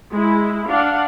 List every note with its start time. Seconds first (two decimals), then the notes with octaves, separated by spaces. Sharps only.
0.14 G#3 E4
0.70 D4 F5 F#5